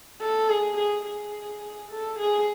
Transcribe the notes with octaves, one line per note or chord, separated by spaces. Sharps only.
A4
G#4
G#4
G#4
A4
G#4